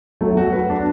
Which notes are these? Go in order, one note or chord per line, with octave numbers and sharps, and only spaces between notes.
F#3 A3
F#4
B4
D4